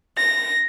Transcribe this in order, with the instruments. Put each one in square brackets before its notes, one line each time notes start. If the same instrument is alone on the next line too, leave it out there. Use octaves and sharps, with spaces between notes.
[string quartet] A#6